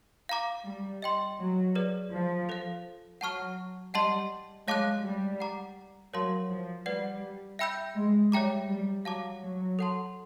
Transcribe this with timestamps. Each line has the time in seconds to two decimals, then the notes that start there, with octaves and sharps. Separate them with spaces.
0.29 F5 A#5 D6
0.66 G3
1.02 D#5 G5 C6
1.39 F#3
1.75 G#4 B4 D5
2.12 F3
2.49 A4 C5 F5
3.21 F#3 F#5 A5 C#6 F6
3.94 G3 D#5 F#5 A5 C6
4.67 G#3 C#5 F5 A5 D6 F#6
5.03 G3
5.40 F#5 A#5 D6
6.13 F#3 A#4 C#5 F5 A5 C6
6.50 F3
6.86 G3 B4 D5 F#5
7.59 E5 G5 B5 E6 G6
7.96 G#3
8.32 G3 C#5 E5 G5 A#5 D6
8.69 G3
9.05 F#3 F5 A5 D6
9.42 F#3
9.79 A4 C#5 F#5 A5 C6